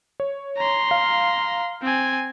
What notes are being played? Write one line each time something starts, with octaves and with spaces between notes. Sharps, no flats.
C#5
A#5 C6
F5
C4 G#5